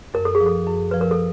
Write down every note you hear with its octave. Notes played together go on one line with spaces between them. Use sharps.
F#2 A#4
A4
G#4
F3
A4
F#2
F3 B4
A#4
A4